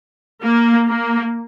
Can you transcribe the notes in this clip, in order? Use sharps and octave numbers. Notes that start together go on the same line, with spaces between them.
A#3
A#3